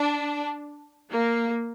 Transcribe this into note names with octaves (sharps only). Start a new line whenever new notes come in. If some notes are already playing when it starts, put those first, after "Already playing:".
Already playing: D4
A#3